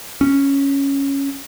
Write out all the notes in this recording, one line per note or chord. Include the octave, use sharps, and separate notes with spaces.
C#4